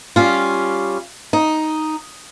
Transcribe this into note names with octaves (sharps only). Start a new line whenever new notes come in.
G3 C#4 F4
D#4